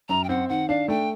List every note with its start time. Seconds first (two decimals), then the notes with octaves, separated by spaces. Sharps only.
0.09 F#2 A#5
0.24 G5
0.29 C4 F#5
0.49 D#3 F#5
0.69 D4 F5
0.88 A3 G5